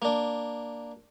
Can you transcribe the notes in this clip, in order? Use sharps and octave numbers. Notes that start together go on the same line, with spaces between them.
A#3 D4